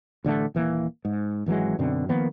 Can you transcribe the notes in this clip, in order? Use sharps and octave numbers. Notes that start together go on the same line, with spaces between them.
A1 D3 G#3 A3
D#1 E3 G#3 A#3
G#2
G#1 E3 F#3 G#3
F#2 B2 D3 C4
D#3 F3 A#3 B3